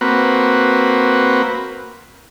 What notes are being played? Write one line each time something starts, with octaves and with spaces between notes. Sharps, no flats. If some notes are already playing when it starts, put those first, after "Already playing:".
A#3 C4 F#4 B4